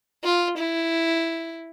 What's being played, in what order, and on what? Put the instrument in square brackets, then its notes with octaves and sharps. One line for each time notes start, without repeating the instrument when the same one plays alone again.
[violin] F4
E4